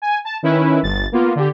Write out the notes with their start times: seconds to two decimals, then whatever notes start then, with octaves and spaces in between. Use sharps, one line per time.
0.02 G#5
0.25 A5
0.43 D#3 C#4 E4 B4
0.83 G1 A6
1.12 A#3 B3 F4
1.36 D3 G4